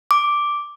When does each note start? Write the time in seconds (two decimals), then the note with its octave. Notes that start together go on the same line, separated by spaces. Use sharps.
0.11 D6